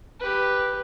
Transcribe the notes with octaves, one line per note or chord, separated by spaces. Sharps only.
G4 B4